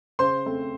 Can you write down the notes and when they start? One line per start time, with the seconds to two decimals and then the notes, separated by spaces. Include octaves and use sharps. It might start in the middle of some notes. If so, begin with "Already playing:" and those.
0.19 C#3 C5 C6
0.46 A3 C4